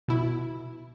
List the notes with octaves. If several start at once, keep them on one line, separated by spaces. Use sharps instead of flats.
B2 E4